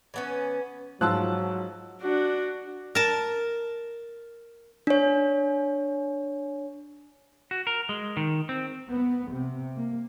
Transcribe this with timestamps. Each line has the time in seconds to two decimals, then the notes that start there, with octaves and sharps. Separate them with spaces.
0.14 E3 B3 C#4
1.01 G#2 F3 F#3 A5 E6 F#6
2.02 D4 F#4
2.95 A#4 A5
4.87 D4 C#5
7.51 F#4
7.67 A#4
7.89 G#3
8.17 D#3
8.49 C4
8.90 B3
9.31 C3
9.76 A#3